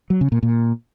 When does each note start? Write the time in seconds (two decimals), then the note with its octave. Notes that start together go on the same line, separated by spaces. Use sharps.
0.10 F#3
0.21 C#3
0.32 A#2
0.43 A#2